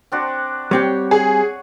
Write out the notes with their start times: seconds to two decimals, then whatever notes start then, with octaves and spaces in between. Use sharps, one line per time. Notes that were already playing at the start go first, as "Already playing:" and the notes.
0.12 C4 D4 F#4
0.71 G3 C4 G4 C#5
1.11 G#4